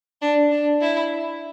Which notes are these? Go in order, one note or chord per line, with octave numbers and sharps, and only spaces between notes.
D4
D4
E4